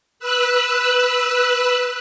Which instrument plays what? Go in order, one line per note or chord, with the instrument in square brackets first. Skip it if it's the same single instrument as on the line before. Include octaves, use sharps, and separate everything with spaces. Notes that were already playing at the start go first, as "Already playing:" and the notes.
[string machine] B4 E6 F#6